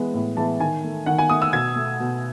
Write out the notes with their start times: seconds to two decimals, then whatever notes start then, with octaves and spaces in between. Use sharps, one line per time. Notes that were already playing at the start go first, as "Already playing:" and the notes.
Already playing: E3 G#3 B3
0.14 A2
0.37 E3 G#3 B3 A5
0.60 D#3 G#5
0.84 A3
1.06 D#3 F#5
1.18 G#5
1.30 A3 D#6
1.42 E6
1.53 B2 G#6
1.76 A3
2.00 B2